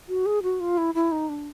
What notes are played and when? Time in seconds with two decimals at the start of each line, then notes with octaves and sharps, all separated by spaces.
0.08 F#4
0.26 G#4
0.43 F#4
0.60 F4
0.78 E4
0.95 E4
1.12 D#4
1.29 D4